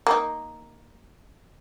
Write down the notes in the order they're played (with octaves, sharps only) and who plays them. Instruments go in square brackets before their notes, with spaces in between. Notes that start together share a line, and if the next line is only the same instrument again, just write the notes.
[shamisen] A#3 D#4